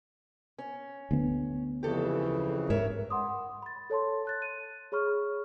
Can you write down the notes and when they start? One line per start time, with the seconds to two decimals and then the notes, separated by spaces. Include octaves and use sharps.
0.58 C#4
1.11 D2 B3
1.83 F2 C#3 E3 G4 A4
2.70 G#2 A#4 C#5 E5
3.10 F#5 B5 C6 D6 D#6
3.62 B5 A6
3.90 A4 C#5 A5 C6
4.25 A5 F#6 A6
4.42 D#7
4.92 G#4 C#5 B5 C#6 F6